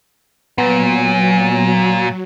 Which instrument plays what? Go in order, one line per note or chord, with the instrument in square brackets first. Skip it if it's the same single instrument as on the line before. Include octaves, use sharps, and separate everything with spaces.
[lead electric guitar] A#2 [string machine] F#3 [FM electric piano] B3